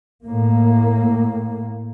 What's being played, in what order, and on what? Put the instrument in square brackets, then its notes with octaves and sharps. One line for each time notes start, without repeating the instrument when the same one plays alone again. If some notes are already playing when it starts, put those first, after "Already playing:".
[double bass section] A2 A#3